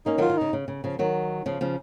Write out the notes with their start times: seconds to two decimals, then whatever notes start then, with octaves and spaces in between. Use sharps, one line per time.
0.06 A#3 C#4 D#4
0.18 D#3 F#3
0.22 F4
0.29 D#3
0.37 C#3 D#4
0.53 C#3
0.68 C#3
0.84 C#3 F3
0.99 D#3 F#3
1.46 C#3 F3
1.61 C#3 F3